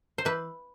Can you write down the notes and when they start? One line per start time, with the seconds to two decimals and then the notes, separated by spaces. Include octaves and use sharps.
0.18 C5
0.25 E3 B4